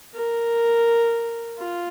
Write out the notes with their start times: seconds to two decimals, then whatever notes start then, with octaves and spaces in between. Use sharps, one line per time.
0.15 A#4
1.59 F4